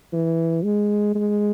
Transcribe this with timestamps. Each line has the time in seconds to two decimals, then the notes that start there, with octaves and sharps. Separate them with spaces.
0.13 E3
0.64 G#3
1.15 G#3